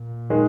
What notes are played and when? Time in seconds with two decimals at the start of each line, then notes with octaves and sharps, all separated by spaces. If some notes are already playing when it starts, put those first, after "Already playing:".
Already playing: A#2
0.30 D#3 G#3